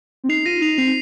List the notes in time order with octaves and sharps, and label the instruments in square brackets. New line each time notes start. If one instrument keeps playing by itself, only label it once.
[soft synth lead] C4
[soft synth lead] D#4 [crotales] C7 F7
[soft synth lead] F4 [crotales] A#6 D#7
[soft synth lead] D#4 [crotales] C7 F7
[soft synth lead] C4 [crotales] C7 F7